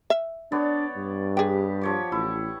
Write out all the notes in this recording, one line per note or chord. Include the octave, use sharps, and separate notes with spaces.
E5
B3 D4 C#5 D5
G2
G4 G#4 G5
F3 C#5 D6
A1 E4